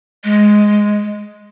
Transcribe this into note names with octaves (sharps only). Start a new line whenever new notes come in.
G#3